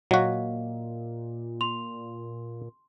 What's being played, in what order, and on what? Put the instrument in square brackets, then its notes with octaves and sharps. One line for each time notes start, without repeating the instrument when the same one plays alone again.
[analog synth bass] A#2 [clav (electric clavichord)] F#3 F#4 [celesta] D#5 F5
[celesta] C6 F7